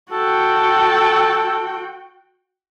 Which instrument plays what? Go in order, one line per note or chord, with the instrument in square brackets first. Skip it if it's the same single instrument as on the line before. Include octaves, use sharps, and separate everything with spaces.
[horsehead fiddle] F#4 G5 [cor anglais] A4